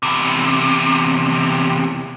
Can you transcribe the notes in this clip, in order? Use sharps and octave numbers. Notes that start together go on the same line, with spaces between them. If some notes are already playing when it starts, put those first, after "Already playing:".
E2 C3